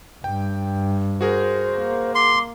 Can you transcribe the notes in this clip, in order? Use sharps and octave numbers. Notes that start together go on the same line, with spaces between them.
G2 G5
F#4 G#4 A#4 C5
A#3
C6 D6